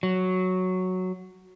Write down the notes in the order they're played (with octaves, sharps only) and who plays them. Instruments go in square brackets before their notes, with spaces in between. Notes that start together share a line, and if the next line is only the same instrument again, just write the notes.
[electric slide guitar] F#3